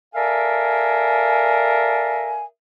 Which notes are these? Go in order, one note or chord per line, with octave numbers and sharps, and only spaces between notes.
A4 A#4 D5 E5 F5 G#5